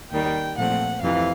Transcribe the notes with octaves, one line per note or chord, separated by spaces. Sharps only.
D#2 D#3 G3 G5
A#2 F3 A3 C4 F#5
F2 C3 E3 F5